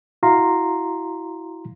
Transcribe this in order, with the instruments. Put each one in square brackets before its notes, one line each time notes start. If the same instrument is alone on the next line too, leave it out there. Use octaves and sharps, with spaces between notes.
[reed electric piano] E4 F#4 F5 A#5 C6